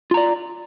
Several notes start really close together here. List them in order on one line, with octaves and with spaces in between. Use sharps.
F4 A#5 D5